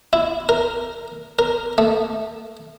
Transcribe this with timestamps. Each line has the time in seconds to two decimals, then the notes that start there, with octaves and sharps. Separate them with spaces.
0.13 E4
0.49 A#4
1.39 A#4
1.78 A3